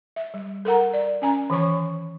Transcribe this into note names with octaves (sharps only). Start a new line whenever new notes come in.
E5
G3
A4 A#4 F#5 A#5
D5
C#4 G#5 A#5
D#3 E3 C#5 C#6